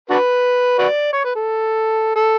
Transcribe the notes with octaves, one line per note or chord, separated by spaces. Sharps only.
D4 F#4 B4
F#4 B4 D5
C#5
B4
A4
A4